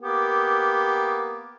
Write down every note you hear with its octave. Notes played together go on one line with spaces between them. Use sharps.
A#3 B3 G4